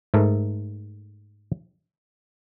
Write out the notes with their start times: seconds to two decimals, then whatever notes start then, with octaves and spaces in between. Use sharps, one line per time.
0.14 G#2 A3 A4 A#4